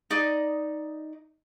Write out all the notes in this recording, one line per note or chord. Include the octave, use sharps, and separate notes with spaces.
D#4 D5 D#5 D#6